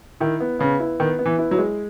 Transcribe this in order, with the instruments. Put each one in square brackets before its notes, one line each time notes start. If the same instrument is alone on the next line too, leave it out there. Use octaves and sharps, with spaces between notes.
[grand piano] D#3 [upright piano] E4
[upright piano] B3
[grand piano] C#3 [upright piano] B3
[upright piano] E4
[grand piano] D#3 [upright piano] B3
[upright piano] B3
[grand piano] E3
[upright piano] E4
[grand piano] F#3
[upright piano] G#3